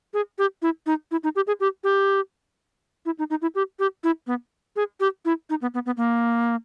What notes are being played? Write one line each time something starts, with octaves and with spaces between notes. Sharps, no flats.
G#4
G4
E4
D#4
E4
D#4
G4
G#4
G4
G4
E4
D#4
D#4
E4
G4
G4
E4
B3
G#4
G4
E4
D#4
B3
B3
B3
A#3